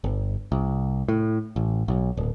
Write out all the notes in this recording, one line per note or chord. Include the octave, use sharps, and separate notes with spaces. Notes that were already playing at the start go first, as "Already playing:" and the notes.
G1
C2
A2
A1
B1
D1